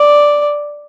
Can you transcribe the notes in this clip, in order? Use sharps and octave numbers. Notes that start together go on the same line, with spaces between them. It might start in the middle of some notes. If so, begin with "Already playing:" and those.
Already playing: D5